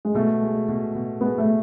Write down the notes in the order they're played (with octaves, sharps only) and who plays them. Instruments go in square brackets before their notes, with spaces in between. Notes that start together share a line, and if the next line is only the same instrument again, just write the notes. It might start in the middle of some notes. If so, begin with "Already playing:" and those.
[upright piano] G#3
[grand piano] B2 [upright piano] A3
[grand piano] G#3
B2
B2
[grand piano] G#3 [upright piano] B3
[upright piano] A3